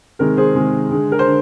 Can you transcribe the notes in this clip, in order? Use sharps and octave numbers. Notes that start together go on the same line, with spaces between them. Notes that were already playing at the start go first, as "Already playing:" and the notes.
C3 D#3 G#3 A#4
G#4 C5
C3 D#3 G#3
D3 G#3
A#4
C5
D3